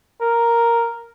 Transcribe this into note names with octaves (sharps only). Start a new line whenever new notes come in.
A#4